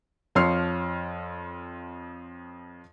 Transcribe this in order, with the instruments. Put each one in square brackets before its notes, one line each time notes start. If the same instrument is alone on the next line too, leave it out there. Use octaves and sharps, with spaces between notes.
[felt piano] F2 F3 C#5 C6 F6 C7